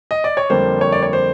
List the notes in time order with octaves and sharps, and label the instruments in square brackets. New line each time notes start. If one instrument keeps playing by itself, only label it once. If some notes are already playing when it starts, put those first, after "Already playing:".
[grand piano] D#5
D5
C#5
F2 D3 G3 A#3 C5
C#5
D5
C#5
C5